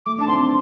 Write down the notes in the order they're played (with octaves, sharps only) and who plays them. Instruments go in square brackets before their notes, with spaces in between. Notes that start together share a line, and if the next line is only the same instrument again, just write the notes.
[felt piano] A3 [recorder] D6
[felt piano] D4 [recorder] A5
[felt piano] C4 [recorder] C6